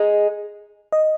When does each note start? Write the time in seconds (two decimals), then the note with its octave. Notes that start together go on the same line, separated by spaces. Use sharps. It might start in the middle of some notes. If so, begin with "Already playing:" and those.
Already playing: G#3 D#4 G#4
0.92 D#5